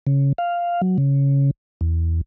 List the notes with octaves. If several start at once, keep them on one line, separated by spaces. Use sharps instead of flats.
C#3
F5
F#3
C#3
E2